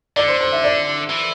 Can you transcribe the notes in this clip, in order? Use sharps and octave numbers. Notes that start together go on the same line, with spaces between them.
D3 D5
C5
C5
E5
D5
E3